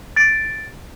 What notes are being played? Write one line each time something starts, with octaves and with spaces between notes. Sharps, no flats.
A6 D7